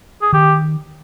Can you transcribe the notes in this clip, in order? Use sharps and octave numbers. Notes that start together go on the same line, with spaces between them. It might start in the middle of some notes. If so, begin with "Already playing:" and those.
G#4
D#3 G4